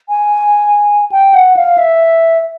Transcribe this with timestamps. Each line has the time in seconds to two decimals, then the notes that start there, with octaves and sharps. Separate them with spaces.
0.09 G#5
1.12 G5
1.34 F#5
1.57 F5
1.78 E5